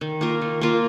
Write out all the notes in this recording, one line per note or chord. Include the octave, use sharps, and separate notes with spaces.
D#3
A#3 F4 A#4
D#3
A#3 F4 A#4